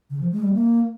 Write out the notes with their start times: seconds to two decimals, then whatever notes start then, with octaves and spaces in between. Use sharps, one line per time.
0.10 C#3
0.21 F3
0.32 G#3
0.43 G3
0.53 A#3